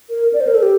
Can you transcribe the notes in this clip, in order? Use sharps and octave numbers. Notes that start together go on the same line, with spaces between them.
A#4
D5
C5
A#4
A4
G4